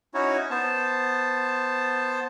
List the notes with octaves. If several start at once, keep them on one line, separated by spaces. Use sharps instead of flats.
C#4 D#4 E4 F#4 C#5
B3 C5 A5